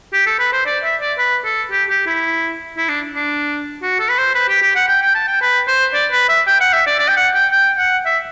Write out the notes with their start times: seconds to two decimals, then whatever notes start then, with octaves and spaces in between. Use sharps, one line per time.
0.13 G4
0.26 A4
0.39 B4
0.53 C5
0.66 D5
0.84 E5
1.01 D5
1.18 B4
1.45 A4
1.71 G4
1.89 G4
2.06 E4
2.77 E4
2.89 D4
3.12 D4
3.82 F#4
4.00 A4
4.09 B4
4.18 C5
4.35 B4
4.49 G4
4.62 G4
4.75 F#5
4.88 G5
5.02 G5
5.15 A5
5.27 G5
5.41 B4
5.68 C5
5.94 D5
6.12 B4
6.29 E5
6.47 G5
6.61 F#5
6.73 E5
6.87 D5
6.99 D5
7.08 G5
7.17 F#5
7.35 G5
7.52 G5
7.79 F#5
8.06 E5